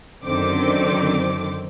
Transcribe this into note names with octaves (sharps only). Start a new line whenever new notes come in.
F#2 D3 D#3 C4 D6